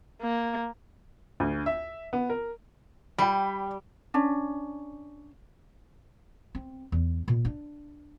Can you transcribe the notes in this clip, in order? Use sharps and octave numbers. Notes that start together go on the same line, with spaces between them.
A#3
D2
E5
B3
A#4
G3 G5 B5
C#4 D4
C4
E2
A#2
D4